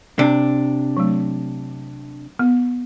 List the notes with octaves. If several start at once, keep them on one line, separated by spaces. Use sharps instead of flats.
C3 D4
F#3 A3
B3